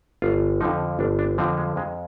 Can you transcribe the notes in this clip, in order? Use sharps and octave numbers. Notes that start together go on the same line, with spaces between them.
G1 F4
F2 D3 F3 D#4
G1 D4
D4
F2 D3 F3 C4
G#3
F2 G#3